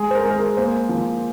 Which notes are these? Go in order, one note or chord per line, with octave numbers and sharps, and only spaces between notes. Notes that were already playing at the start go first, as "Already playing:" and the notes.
Already playing: G#3 G#4
C5
A#4
G#3 A#4
G#4
A#3 C5
F3